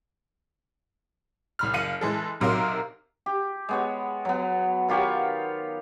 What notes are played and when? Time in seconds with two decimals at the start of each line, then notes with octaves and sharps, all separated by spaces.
1.59 C2 B5 F6
1.74 F#1 F5 C#7 D#7 F#7
2.01 E3 G#3 A4
2.40 B1 C3 F#3 A#4 F5 C6
3.26 G4
3.69 G#3 B3 C#5
4.25 F#3 B3
4.89 D#3 F4 G4 C#5